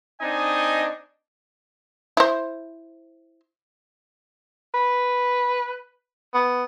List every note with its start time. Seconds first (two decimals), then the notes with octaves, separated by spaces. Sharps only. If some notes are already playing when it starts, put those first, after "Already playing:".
0.21 C4 D4 D#4 D#5 G#5
2.17 E4 C5
4.74 B4
6.34 B3